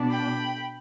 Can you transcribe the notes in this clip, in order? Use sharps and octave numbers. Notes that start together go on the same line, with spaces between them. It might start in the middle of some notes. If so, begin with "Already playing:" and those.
Already playing: B2 B3 D4
G5 B5